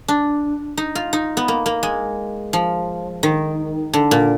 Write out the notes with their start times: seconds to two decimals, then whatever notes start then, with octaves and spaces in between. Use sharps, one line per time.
0.08 D4
0.77 D#4
0.95 F4
1.13 D#4
1.37 B3
1.48 A#3
1.66 A#3
1.83 G#3
2.53 F3
3.23 D#3
3.93 D3
4.11 A#2